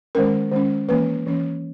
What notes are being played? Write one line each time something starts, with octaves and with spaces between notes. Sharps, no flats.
D#3 G#3 C#4 A#4
D#3 G#3 C#4
E3 A#3 C#4 B4
E3 A#3 C#4